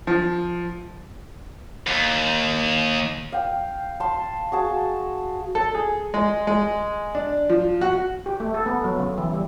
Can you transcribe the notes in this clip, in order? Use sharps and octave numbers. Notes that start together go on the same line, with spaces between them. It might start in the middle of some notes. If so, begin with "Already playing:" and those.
F3
D#2
F5 G5
A5 C6
F#4 G#4 A5
A4
G#4
G#3
G#3
D4
F3
F#4
G4
A3
A4
B3
F#3
C#3
E3
G3